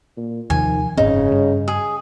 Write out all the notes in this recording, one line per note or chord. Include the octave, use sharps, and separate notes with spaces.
A#2
D#2 C3 D#3 F3 G#5
F#1 G#2 C#3 C4 D#4
G2
G#4